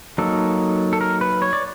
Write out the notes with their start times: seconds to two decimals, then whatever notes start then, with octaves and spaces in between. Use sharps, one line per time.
0.18 F#3 A#3 D#4 A4
0.93 A4
1.01 A#4
1.21 B4
1.42 C#5
1.53 D5